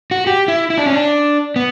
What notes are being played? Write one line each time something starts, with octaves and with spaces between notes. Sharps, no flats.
F#4
G4
E4
E4
D4
C#4
D4
B3